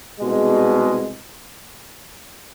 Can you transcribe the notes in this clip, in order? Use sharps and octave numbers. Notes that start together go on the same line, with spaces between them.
C2 B2 G#3